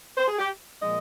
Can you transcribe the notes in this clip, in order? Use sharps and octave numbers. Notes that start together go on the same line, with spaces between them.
C5
G#4
G4
A#2 F3 G#3 D#5